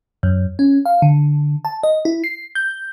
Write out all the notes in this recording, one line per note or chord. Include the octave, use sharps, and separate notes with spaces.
F#2
C#4
F5
D3
A5
D#5
E4
C7
G6